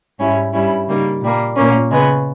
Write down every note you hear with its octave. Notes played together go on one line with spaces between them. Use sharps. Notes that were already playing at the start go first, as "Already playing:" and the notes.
G#2 G3 C#4 E4
G2 G3 C#4 E4
C#3 G3 A#3 D#4
A#2 G3 A#3
A#2 A#3 C#4
C#3 G#3 B3